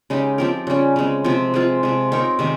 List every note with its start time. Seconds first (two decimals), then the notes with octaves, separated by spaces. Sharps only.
0.10 C#3 G#3 D#4 G4
0.38 F3 C4 G4 A#4
0.67 C#3 G3 C#4
0.96 C#3 G#3 C4
1.24 C3 F3 C4
1.54 G#3 C4 F4
1.83 C3 F3 G#3
2.12 C4 D#4 A#4 C#5
2.39 C3 D#3 G#3 C4